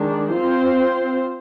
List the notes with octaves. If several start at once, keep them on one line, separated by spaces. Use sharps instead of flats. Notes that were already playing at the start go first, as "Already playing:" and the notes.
Already playing: D#3 G#3 D4
C4 F4 C5